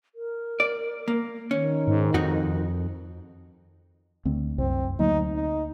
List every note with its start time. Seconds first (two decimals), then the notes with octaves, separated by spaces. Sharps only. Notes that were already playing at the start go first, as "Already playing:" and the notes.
0.15 A#4
0.60 D5
1.08 A#3
1.51 D#3 C#4
1.88 G#2
2.14 F2 D#4 F#4
4.25 D2 C4
4.58 C2 F#2 C4
4.99 D2 F#3 A#3 D#4
5.35 D#4